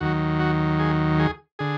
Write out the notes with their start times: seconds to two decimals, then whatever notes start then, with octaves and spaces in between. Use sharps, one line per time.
0.01 D#2 D#3 F#3 F#4
0.40 F#4
0.79 G#4
1.19 G#4
1.59 D3 G#4